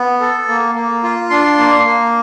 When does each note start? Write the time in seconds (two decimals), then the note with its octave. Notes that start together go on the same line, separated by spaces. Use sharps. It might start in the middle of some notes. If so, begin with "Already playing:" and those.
Already playing: B3
0.20 A4
0.48 A#3
0.75 A#3
1.03 F4
1.30 D4 C6
1.58 A#3
1.85 A#3